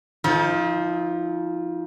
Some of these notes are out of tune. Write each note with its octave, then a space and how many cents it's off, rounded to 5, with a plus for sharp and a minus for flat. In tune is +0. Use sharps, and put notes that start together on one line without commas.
F3 +0 D#4 +40